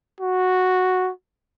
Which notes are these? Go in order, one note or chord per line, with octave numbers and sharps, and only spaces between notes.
F#4